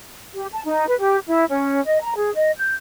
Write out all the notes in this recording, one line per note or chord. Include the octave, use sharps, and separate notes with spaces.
G4
A5
D#4
B4
G4
E4
C#4
D#5
A#5
G#4
D#5
G6